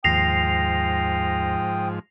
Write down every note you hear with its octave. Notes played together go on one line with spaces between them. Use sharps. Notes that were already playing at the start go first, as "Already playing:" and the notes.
D#2 G#2 F3 G5 D#6 A#6 C7 F7